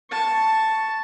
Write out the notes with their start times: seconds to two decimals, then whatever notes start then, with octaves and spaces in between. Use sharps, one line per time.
0.11 A5 C#6